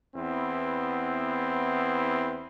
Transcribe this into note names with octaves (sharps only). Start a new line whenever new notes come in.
E2 B3 C4 E4